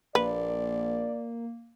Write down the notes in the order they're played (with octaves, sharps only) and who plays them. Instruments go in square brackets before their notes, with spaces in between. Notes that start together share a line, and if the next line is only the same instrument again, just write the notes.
[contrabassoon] A#1 [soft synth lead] A#3 [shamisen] B4 [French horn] D5